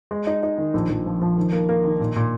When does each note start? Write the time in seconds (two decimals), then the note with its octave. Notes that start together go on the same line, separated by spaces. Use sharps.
0.11 G#3
0.27 D#4
0.43 D#4
0.58 D#3
0.74 A#1
0.90 A#1
1.06 F3
1.21 F3
1.37 D#3
1.52 A#3
1.69 A#3
1.84 D#3
2.00 A#2
2.16 A#2